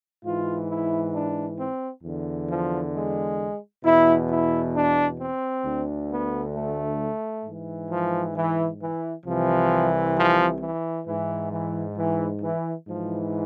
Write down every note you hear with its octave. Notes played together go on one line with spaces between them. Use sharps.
G#2 E3 F4
E4
D4
C4
E2 D3
F3
G#3
E2 B2 E4
E4
D4
C4
D2 D3
B3
A3
G#2 E3
F3
E3
E3
C2 C3 E3 F3
F3
E3
G#2 E3
E3
E3
E3
G#2 E3 F3